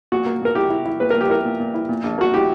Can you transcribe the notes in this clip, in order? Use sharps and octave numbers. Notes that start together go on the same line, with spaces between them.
A#2 F#4
A#3
A#2 A#4
E4 G4
E4
E4
A#2 B4
A#2 A#4
G4
E4 A#4
A#2
A#2
E4
A#2
A#1
A#3 F#4
E4 G4